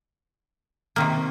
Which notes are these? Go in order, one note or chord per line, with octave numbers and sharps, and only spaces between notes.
C3 D#3 A#3